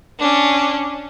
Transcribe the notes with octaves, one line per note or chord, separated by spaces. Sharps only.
C#4 D4